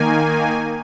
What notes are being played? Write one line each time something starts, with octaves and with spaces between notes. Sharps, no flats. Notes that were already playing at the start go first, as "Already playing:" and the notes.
Already playing: D#3 A#3 G#5